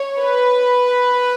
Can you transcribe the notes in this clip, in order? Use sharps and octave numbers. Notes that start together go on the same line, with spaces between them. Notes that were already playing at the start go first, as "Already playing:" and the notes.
Already playing: C#5
B4